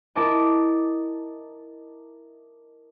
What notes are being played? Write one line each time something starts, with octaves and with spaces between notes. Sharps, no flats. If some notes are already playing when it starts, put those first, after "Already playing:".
E4 A#4 D#5 A5 D6